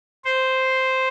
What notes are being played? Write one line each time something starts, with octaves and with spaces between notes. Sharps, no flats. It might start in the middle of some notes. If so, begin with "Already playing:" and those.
C5